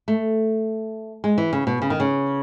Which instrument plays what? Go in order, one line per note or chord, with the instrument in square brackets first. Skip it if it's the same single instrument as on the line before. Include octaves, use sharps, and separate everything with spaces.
[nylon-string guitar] A3
G#3
E3
C#3
B2
C#3
D#3
C#3